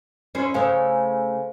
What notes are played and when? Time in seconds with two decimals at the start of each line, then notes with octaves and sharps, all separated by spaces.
0.35 C#4 E4 C5
0.54 C#3 A3 C5 F5 G#5